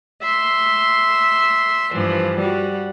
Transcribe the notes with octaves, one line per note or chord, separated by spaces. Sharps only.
E5 C6
G2 E3 F3
G3 F#4